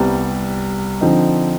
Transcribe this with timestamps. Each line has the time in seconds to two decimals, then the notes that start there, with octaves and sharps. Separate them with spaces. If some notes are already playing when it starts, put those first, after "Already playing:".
Already playing: C2 C3 G3 B3
1.01 D3 F3 C4 D#4